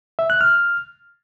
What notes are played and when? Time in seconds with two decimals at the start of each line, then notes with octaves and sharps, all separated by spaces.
0.19 E5
0.30 F#6
0.41 F6